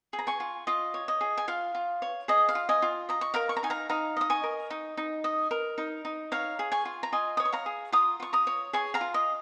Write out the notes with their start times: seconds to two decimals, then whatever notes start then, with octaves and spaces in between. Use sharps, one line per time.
0.13 G#4
0.19 A#5
0.27 G#5 C#6
0.40 F4
0.67 F4 D#5
0.94 C#5
1.08 D#5
1.21 G#4
1.37 G#5
1.48 F4 F5
1.75 F4
2.02 C#5
2.28 G#4 D#5
2.49 F5
2.55 F4
2.69 D#5 G#5
2.82 F4
3.09 D#5 A#5
3.21 C#6
3.34 A#4 F5 A#5
3.49 C#6
3.57 A#5
3.63 D#4 G#5
3.70 F5 A#5
3.89 D#4 F5 A#5
4.17 D#5 D#6
4.30 G#5 C#6
4.43 A#4
4.70 D#4
4.97 D#4
5.24 D#5
5.51 A#4
5.78 D#4
6.05 D#4
6.32 C#5 F5 A#5
6.59 G#4
6.72 G#5 C#6
6.85 F4
7.03 A#5
7.12 F4 D#5 G#5
7.37 C#5 D#6
7.45 C#6
7.53 F5 A#5
7.66 G#4
7.92 F4 A#5 D#6
8.20 F4 C#6
8.33 A#5 D#6
8.47 C#5
8.73 G#4 G#5 C#6
8.94 F5 A#5
9.01 F4
9.14 D#5